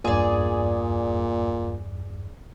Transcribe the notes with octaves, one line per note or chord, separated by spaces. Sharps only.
B1 E2 G2 A#2 G#4 D5